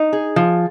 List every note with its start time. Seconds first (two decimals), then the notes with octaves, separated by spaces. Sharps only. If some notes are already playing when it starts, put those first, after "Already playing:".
Already playing: D#4
0.13 G#4
0.36 F3